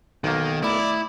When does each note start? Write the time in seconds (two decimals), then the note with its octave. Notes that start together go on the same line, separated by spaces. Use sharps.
0.24 B1 D#3 A#3
0.63 A3 E4 D5 B5